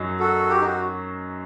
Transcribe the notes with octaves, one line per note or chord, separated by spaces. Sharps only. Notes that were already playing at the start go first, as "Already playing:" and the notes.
Already playing: F#2 F#3 D#4
F#4 A4
G4
D#4
F#4